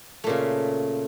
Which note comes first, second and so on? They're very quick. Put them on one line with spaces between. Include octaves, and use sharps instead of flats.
A3 A#2 C#3